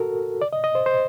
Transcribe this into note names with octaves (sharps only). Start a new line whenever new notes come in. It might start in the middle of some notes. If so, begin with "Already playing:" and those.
Already playing: F#4 A4 A#4
D5
D#5
D#5
C5
C5